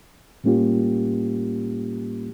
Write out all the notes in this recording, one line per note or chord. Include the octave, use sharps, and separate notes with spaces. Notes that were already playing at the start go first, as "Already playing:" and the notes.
A2 G3 A#3 C#4 F4 G4